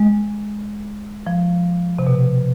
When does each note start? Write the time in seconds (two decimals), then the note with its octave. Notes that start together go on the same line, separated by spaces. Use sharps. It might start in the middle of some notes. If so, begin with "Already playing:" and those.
Already playing: G#3
1.26 F3
1.99 C3
2.07 B2